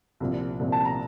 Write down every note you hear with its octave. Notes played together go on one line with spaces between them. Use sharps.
C2 A#2 F3
C2 A#2 F3
A5
A#5